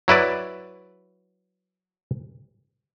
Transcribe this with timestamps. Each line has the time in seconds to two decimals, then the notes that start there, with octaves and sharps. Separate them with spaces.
0.08 F#3 E4 B4 D5